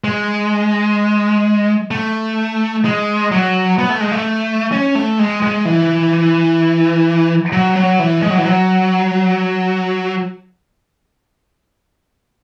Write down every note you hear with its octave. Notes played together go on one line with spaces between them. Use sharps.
G#3
A3
G#3
F#3
B3
A3
G#3
A3
C#4
A3
G#3
G#3
E3
F#3
F#3
E3
G#3
F#3
E3
F#3